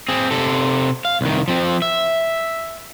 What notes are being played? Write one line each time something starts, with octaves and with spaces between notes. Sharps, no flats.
C4 G#4
C3 A4
F5
C2 D#3
F3 C4
E5